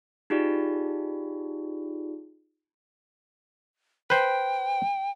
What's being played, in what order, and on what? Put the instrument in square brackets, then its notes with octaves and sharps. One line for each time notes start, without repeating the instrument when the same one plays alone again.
[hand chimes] D#4 F4 G4 G#4 D5
[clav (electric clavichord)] B4 C5 [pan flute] G5